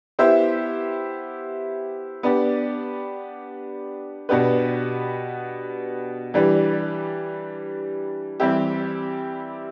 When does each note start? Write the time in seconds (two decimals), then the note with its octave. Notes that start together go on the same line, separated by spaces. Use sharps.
0.19 B3 E4 G4 C5 E5
2.23 B3 D4 G4 D5
4.29 B2 B3 D4 G4 B4
6.34 E3 G3 D4 G4 B4
8.40 E3 G3 C4 E4 G4